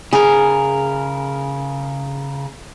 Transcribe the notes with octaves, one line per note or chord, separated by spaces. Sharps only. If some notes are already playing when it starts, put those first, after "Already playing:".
C#3 G#4 A#4